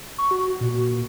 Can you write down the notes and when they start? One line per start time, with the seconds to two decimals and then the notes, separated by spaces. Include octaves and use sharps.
0.18 C#6
0.31 F#4
0.61 A#2